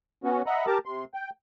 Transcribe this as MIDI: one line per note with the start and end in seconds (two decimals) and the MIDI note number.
0.24 0.42 59
0.24 0.42 61
0.24 0.42 66
0.46 0.66 75
0.46 0.66 76
0.46 0.66 78
0.46 0.66 82
0.46 0.66 83
0.67 0.78 67
0.67 0.78 70
0.67 0.78 81
0.67 0.78 82
0.67 0.78 86
0.86 1.05 48
0.86 1.05 84
1.14 1.30 79